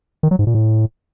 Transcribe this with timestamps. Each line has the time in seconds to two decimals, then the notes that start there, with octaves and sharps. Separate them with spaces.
0.23 D#3
0.31 F#3
0.39 G#2
0.47 A#2
0.55 A2